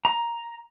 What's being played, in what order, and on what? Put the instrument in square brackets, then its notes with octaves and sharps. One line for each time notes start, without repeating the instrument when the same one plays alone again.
[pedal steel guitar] A#5